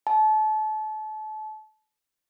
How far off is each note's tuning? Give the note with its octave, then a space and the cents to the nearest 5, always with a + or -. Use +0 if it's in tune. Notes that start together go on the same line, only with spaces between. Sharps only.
A5 -30